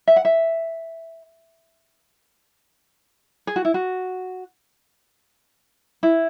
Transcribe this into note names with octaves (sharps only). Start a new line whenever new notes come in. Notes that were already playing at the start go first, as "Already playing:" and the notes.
E5
F#5
E5
G#4
F#4
E4
F#4
E4